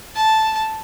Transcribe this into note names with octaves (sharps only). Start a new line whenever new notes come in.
A5